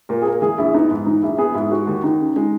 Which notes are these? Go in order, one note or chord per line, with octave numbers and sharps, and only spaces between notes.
A#2 A#4
G#4
A#3 A#4
E3 G#4
A#1 E4
B3 D#4
G#2
E3 D#4
A#1 E4
B3 G#4
G#2 E4
G#3 F#4
D#2
D#2 D#4
C#3
G#3 D#4